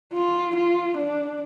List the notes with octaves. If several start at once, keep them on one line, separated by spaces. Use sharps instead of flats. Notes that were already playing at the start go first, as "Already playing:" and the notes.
F4
F4
D4